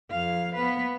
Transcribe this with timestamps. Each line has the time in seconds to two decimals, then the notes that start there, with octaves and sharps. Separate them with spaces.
0.11 F2 F5
0.55 B3 B4